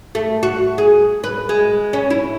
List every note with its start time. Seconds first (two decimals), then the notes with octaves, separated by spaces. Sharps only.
0.15 A3
0.43 F#4
0.78 G#4
1.24 B4
1.49 G#3
1.93 C#4
2.10 E4